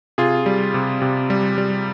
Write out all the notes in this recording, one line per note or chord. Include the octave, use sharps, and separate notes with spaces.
C3 F4 G#4
G3
C3
C3
G3
G3